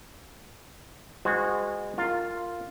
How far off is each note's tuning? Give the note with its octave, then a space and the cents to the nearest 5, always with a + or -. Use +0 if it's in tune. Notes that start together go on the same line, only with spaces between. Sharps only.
G#3 -25 F#4 -20 C5 -35
F4 +0 A#4 -20